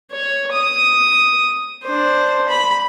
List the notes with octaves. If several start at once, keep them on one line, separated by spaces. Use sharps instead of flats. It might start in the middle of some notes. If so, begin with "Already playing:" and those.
C#5
D#6
D4 C5
B5